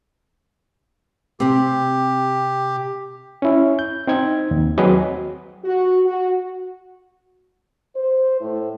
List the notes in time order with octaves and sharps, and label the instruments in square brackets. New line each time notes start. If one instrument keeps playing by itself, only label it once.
[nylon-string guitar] C3 C4 [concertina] G4
[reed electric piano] C#4 E4
G6
C4 D#4 G#6
D#2
F#3 C4 G#4 B4 D#5
[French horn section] F#4
F#4
C5
A2